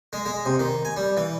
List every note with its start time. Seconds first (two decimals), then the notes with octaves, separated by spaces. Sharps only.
0.13 G#3
0.26 G#3
0.46 C3
0.60 D#3
0.85 G#5
0.97 G3
1.17 E3